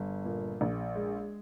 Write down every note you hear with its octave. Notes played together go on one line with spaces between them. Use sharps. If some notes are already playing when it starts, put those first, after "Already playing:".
Already playing: G1
A#2
A#1
G#3